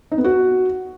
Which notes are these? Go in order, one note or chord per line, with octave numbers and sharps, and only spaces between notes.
D#4
B3
F#4